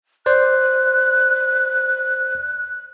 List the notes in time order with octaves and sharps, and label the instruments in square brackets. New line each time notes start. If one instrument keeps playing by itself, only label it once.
[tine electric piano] C5 D5 [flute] F#6